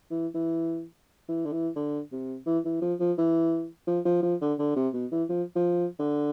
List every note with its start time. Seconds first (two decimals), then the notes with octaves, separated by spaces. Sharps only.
0.10 E3
0.34 E3
1.29 E3
1.46 D3
1.52 E3
1.76 D3
2.12 C3
2.46 E3
2.65 E3
2.82 F3
3.00 F3
3.18 E3
3.87 F3
4.05 F3
4.23 F3
4.41 D3
4.59 D3
4.76 C3
4.93 B2
5.12 E3
5.29 F3
5.56 F3
5.99 D3